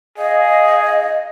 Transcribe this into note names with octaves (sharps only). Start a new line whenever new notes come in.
G#4 D#5 F5